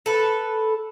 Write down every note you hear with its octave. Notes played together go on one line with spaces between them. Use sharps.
A4 B4